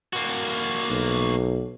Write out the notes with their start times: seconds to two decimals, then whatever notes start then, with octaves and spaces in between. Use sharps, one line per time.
0.13 A#3 F#4
0.90 B1